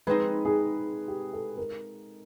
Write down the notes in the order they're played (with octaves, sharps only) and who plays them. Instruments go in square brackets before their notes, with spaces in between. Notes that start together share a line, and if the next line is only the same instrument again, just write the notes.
[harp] G#3 C4 D#4 [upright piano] B4
[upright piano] G#4
G4
A4
A#4